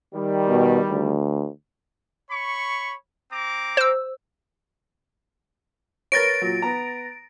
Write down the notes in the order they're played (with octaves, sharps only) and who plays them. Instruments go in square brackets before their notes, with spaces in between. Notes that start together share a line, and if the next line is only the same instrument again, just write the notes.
[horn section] D#3 G3
[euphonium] B2
D2
[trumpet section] C#5 B5 C#6
C4 A#5 D6
[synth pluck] C5 E6
[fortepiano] A#4 B4 C#5 [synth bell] A6 A#6 D7
[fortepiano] A#2 F#3
B3 A#5